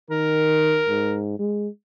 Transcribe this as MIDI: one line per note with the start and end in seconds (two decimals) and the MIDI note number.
0.10 0.83 51
0.10 1.19 70
0.89 1.38 44
1.39 1.68 56